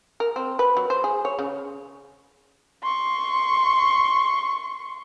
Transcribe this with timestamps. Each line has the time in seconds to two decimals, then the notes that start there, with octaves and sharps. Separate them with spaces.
0.20 A#4
0.36 C4
0.59 B4
0.77 F#3
0.90 C5
1.04 G#4
1.25 C#5
1.39 C#3
2.83 C6 C#6